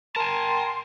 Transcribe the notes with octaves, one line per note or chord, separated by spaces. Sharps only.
A#4 G#5 A5 C6